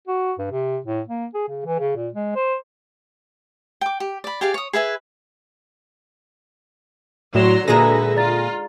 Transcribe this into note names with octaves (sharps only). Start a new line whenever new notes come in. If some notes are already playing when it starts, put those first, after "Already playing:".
F#4
G2
C3
A2
A#3
G#4
C#3
E3
C#3
A#2
G#3
C5
G5 D6
G4
D5 B5
G4 G#4 D5 F5
C#5 D#6
G#4 B4 E5 G#5
A2 F#3 F#4 D5 A#5 C6 E7
A#2 D3 G#3 D#4 G#4 B4 E5 A#6
F4 D5 A#5 A6